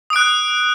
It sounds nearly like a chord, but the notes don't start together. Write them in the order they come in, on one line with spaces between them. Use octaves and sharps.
D#6 D7 F#6